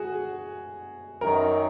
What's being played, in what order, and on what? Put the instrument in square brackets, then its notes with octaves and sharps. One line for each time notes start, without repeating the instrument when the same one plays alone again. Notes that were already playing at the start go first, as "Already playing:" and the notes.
Already playing: [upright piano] F#4 G#4
[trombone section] F#2 D#3 F#3 [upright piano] A#4